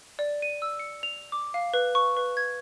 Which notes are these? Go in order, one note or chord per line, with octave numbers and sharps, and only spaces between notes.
D5
D#7
E6
C#7
F7
D6
F5
B4
C#6
B4
G#6